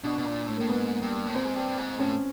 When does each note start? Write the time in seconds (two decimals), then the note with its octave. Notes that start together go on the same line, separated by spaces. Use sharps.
0.04 B2 D4
0.18 B2
0.25 A#2
0.47 A2
0.57 A2 A#3
0.69 G#2 B3
1.02 G2
1.27 A2
1.35 A#2 C4
1.45 G#2
1.56 G2
1.77 G#2
1.99 A2 C#4